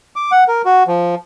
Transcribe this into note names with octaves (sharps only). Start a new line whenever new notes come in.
D6
F#5
A#4
F#4
F3